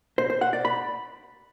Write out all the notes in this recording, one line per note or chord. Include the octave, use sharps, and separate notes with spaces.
C5
C5
F#5
D5
B5